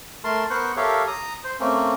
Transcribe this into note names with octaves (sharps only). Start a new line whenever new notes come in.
A3 A#4 A5 C6
B3 A#4 C5 C#6 F#6
G4 A4 A#4 C#5 E5 F5
A#5 D#6
C5
A3 A#3 C4 C#4